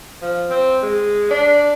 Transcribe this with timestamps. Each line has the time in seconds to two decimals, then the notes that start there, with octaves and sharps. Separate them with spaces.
0.22 F3
0.50 C4
0.82 G#3
1.31 D4